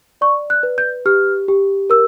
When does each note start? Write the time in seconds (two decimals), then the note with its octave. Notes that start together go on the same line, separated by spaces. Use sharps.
0.21 D5 C#6
0.50 F#6
0.63 B4
0.78 G6
1.06 G4 F6
1.48 G4
1.90 A#4 E6